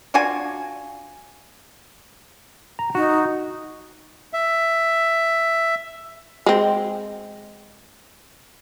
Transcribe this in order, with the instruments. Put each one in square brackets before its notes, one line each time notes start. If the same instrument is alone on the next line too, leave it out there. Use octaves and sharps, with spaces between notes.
[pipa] D4 F4 F#4 G#5
[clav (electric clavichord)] A#5
[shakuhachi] D#4 [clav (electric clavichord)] F#4
[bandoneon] E5
[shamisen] G#3 C4